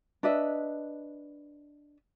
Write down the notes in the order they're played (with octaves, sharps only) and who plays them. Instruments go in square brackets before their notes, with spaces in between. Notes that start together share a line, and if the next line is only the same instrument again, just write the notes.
[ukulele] D4 B4 D#5 E5